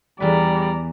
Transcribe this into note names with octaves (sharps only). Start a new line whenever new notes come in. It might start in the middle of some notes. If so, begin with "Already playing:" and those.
E2 G3 B4 D5 A#5